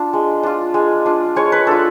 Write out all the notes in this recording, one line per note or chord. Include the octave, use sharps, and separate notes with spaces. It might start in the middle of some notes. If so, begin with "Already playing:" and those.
Already playing: D4 F4
G#3
D4 F4
G#3
D4 F4
G#3 C#5
B4
D4 F4 A4